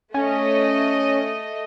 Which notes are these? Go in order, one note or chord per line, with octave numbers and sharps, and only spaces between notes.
A3 C#4 D#5